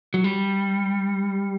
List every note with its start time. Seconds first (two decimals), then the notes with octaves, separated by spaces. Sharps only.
0.14 F#3
0.24 G3